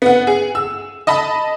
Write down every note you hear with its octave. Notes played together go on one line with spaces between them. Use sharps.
B3 F#5
G#4
E6
D#5 A5 B5